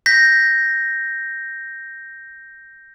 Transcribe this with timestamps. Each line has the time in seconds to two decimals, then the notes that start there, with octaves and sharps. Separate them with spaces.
0.06 G6 A#6 B6